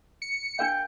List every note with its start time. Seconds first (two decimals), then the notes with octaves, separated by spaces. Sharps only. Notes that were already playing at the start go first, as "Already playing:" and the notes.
0.22 C#7
0.59 D4 A#4 F5 G5